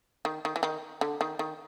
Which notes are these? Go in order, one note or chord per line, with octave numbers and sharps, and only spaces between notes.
D#3
D#3
E3
D#3
D3
D#3
D#3